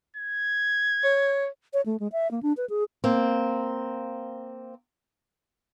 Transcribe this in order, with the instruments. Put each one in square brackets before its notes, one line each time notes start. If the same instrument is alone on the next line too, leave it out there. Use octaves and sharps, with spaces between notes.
[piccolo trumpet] G#6
[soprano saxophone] C#5
[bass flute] C#5
A3
G#3
E5
A#3
D4
B4
G#4
[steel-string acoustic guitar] A#3 C4